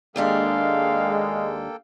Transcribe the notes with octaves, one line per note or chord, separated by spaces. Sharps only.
D#2 G#3 A#3 D4 G4 A4 F5 G5